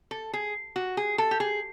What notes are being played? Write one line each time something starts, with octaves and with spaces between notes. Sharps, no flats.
A4
G#4
F#4
G#4
A4
G4
G#4